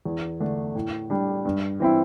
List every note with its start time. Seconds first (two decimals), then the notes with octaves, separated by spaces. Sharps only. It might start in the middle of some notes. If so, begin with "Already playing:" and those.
0.05 E2
0.40 D3 A3 D4
0.75 A2
1.10 G3 D4
1.45 G2
1.80 E3 C4 E4